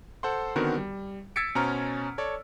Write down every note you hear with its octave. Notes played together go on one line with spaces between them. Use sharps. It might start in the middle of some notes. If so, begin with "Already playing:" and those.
A4 C5 F#5 C6
D3 D#3 B3 C4 F#4 A#4
G3
E6 G#6 A6 B6 C#7 D7
B2 C#4 C5 A#5 F6
A4 C#5 D5